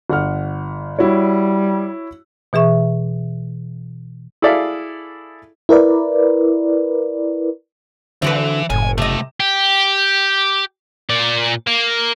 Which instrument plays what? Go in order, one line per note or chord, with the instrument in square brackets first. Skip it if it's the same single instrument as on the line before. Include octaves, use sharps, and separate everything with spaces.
[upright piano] G1 F#5 F6
[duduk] G3 [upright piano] E4 F#4 C#5
[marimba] B2 E3 G#4 E5 C#6
[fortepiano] E4 G#4 A4 D5 E5 F5
[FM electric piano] E4 A#4 B4 D5
[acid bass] D3 [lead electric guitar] E3 [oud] C4 F#4 B4
[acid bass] F#1 [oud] A2 [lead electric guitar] G#5
[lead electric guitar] C#2 A3 [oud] C3 D#5
[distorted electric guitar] G4
A#2 D5
A#3